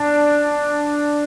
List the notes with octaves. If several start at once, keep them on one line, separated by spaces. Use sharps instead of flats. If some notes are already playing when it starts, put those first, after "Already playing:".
Already playing: D4